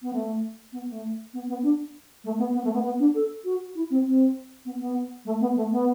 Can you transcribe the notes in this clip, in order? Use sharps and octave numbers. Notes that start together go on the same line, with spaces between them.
B3
A3
B3
A3
B3
B3
D4
A3
B3
B3
A3
B3
B3
D4
A4
F#4
E4
C4
C4
B3
B3
A3
B3
A3
B3